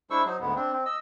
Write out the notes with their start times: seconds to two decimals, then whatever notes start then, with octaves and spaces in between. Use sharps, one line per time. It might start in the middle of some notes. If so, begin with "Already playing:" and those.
0.10 G#3 D4 E4 C5 C#6 E6
0.25 F#3 D#4 C5
0.40 D2 G#2 G#3 B3
0.56 C4 D4
0.72 C4
0.86 D#5 E6